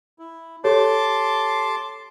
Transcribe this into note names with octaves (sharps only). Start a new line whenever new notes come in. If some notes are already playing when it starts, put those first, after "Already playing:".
E4
G4 A4 C#5 A5 C6 D6